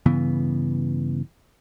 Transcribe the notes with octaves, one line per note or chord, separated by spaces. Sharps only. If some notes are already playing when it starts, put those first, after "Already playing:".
G2 C#3 E3 B3